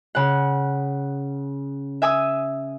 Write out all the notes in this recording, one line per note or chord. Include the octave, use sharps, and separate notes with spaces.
C#3 F#5
E5 G#5 D#6 E6